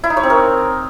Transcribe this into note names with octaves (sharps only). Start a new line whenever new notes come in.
E4
D#4
C#5
C4
A#4